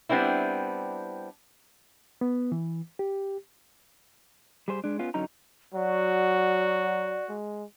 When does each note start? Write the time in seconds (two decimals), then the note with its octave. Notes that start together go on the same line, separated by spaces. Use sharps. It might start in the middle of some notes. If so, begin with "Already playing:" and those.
0.09 G3 B3 C4 D4 E4
2.21 B3
2.52 E3
2.99 G4
4.68 G3 G#4 C5
4.84 G#3 D4
4.99 B3 C#4 F4
5.14 F#2 D3 F#3 C#4 D#4 A#5
5.74 F#3 F#4 D5
7.29 G#3